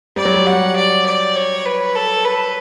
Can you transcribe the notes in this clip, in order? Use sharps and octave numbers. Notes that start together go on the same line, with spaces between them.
G3 D5
F#3
G3
F#5
D5
D5
C#5
B4
A4
B4